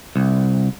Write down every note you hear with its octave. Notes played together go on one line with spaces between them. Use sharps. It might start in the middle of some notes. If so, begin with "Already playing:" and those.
C2